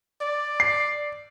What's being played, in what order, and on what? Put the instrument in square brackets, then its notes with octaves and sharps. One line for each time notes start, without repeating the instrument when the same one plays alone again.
[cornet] D5
[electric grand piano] C7